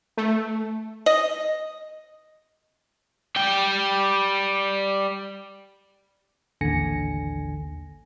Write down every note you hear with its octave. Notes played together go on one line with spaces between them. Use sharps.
A3
D#5
G3 G5
A1 D#2 D3 G#5 A#6 C#7